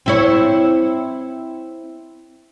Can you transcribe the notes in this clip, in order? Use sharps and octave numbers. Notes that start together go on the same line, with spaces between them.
C4 E4 C#5